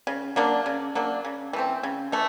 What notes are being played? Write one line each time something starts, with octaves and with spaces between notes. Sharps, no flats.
C#3
F#3 A#3 D4
C#3
F#3 A#3 D4
C#3
E3 A3 C4
C#3
E3 A3